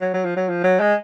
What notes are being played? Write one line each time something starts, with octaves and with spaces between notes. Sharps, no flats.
F#3
F#3
F3
F#3
F3
F#3
G#3